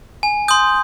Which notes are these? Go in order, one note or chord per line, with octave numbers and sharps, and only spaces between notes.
G#5
C6 D#6 G6